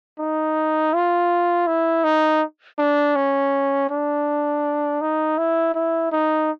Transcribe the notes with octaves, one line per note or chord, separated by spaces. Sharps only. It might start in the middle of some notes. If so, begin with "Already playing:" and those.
D#4
F4
E4
D#4
D4
C#4
D4
D#4
E4
E4
D#4